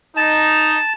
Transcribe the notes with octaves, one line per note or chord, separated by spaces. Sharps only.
D#4 A5